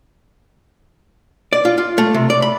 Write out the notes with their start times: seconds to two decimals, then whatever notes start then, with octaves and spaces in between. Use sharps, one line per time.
1.53 D5
1.65 F4
1.78 F4
1.98 A3
2.14 C3
2.30 D5
2.42 B5